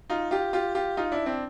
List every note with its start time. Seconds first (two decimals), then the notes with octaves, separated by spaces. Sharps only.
0.10 D#4 F4
0.31 F4 G4
0.53 F4 G4
0.75 F4 G4
0.97 D#4 F4
1.12 D4 E4
1.26 C4 D4